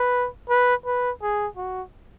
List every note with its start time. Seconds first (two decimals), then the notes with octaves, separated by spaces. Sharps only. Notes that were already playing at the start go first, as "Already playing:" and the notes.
Already playing: B4
0.50 B4
0.86 B4
1.22 G#4
1.57 F#4